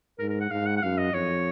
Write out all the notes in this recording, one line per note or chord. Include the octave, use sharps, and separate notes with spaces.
G#2 A#4
A#4
F#5
G#2 F5
F#5
F#5
F#2 F5
D#5
F2 C#5